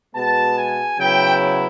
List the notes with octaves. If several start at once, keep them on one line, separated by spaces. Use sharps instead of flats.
B2 G#3 B3 A5
G#5
C#3 F#3 B3 E4 G5